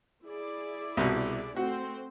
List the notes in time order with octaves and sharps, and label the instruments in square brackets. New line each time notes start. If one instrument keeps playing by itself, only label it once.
[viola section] E4 G#4 D5
[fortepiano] C2 B2
[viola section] A3 C4 C5 [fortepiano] F#4